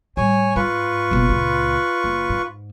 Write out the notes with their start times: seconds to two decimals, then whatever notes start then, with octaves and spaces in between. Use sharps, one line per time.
0.17 A2 G3 C#5 G#5
0.56 G#2 F4 B4 C#6
1.11 F#1 B2
1.29 C#2 A#2
2.04 F#1
2.30 G#2